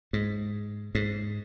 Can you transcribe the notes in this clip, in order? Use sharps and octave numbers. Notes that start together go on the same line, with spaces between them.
G#2
G#2